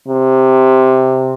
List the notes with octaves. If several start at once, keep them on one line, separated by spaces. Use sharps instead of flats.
C3